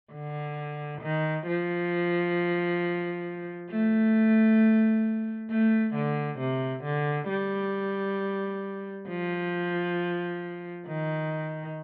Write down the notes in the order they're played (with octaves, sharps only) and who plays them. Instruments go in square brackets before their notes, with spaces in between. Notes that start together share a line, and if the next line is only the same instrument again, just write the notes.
[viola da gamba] D3
D#3
F3
A3
A3
D3
C3
D3
G3
F3
D#3